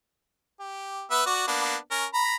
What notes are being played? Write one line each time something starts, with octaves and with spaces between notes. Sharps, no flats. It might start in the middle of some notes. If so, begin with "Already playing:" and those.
G4
B3 B4 E5
F#4 D5
A#3 B3 D4
C#4 A#4
A#5 B5